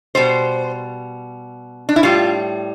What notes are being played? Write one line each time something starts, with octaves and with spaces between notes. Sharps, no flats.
B2 G3 C5
D4
E4
A2 G3 F4